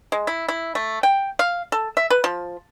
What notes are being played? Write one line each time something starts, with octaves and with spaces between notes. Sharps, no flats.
G#3
E4
E4
A3
G5
F5
A4
E5
B4
F3